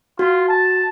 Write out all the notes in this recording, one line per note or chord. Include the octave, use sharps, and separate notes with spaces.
F4 F#4
A5